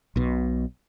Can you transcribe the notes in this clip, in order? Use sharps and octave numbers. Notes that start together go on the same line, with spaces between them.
B1 B2